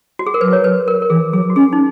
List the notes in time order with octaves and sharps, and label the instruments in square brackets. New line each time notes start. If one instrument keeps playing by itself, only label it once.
[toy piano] F#4
G#4
A#4
[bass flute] F#3 [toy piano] B4
[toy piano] C#5
B4
A#4
A#4
[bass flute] E3 [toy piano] G#4
[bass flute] F#3 [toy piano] G#4
[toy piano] F#4
[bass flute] C#4 [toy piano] G#4
[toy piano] D#4